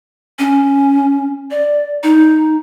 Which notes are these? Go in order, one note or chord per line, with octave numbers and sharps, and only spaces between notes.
C#4
D5
D#4